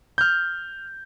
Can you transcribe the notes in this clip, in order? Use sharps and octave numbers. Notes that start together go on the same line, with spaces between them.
F6 G6